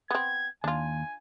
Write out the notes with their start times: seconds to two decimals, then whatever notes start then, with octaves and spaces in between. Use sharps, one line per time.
0.11 B3 C4 G#6
0.64 D#2 D4 F4 G#5